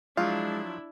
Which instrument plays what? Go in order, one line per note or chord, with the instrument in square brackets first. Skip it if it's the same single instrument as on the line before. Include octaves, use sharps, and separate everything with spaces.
[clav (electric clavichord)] F3 F#3 [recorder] G#3 [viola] D4 E4 [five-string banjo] F4